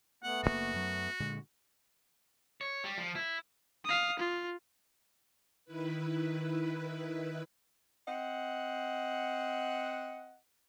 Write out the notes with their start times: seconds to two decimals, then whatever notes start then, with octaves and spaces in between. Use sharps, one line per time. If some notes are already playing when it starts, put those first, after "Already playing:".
0.23 A3 B3 F#5
0.44 F#1 A2 A#3 F#4
0.74 F#2 F#3
1.20 A#2 D3 G#3
2.61 C#5
2.84 G3
2.98 F3
3.15 E4
3.85 F5 D#6
4.19 F4
5.65 D#3 E4 B4
8.08 C4 D#5 F#5